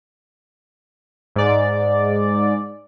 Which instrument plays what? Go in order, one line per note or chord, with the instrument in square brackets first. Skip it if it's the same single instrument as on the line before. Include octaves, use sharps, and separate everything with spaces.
[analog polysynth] G#2 D5